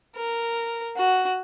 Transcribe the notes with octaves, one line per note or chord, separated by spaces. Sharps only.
A#4
F#4